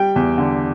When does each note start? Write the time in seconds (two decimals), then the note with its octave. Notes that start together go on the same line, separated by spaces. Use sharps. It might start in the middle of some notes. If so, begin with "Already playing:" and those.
Already playing: G3 G5
0.16 E2
0.38 D3